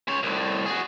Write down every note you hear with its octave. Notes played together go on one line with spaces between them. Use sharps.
G#3 C#5
C2 A2
F#4 G#4